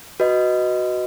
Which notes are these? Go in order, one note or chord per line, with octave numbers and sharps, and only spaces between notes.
F#4 B4 D#5